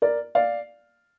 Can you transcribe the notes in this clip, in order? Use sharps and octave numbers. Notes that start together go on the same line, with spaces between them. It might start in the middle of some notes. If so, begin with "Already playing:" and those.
A#4 D5
D5 F5